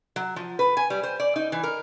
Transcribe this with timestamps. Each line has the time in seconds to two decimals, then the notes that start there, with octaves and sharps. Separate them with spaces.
0.16 F#3
0.36 F3
0.59 B4
0.77 G#5
0.90 G3
1.03 C5
1.20 D5
1.36 D#4
1.52 E3
1.63 A#4